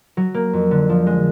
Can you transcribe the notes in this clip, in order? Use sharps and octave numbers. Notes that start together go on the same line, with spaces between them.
F#3
A#3
F2
D3
F3
G#3